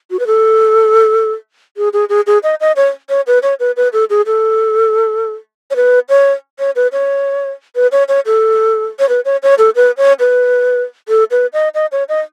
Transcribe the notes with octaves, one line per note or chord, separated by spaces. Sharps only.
F#4
B4
A4
G#4
G#4
G#4
G#4
D#5
D#5
C#5
C#5
B4
C#5
B4
B4
A4
G#4
A4
C#5
B4
C#5
C#5
B4
C#5
B4
C#5
C#5
A4
C#5
B4
C#5
C#5
A4
B4
C#5
B4
A4
B4
D#5
D#5
C#5
D#5